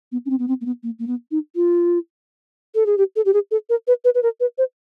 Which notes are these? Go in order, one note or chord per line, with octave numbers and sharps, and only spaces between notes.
B3
C#4
C4
B3
C4
A#3
B3
A#3
A#3
B3
D#4
F4
A4
G#4
G4
A4
G4
G#4
A4
A#4
B4
B4
B4
A#4
B4
C5